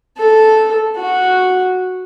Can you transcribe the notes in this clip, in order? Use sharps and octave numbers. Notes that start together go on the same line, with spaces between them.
A4
F#4